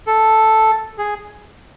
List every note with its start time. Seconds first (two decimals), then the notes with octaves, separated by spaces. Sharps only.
0.07 A4
0.98 G#4